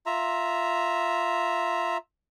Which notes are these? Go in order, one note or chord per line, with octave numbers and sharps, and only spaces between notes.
F4 E5 A#5